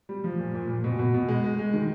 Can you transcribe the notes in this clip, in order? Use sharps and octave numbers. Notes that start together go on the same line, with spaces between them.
G3
F3
A#2
A#2
A#2
B2
B2
B2
G#3
G#3
G#3
D#3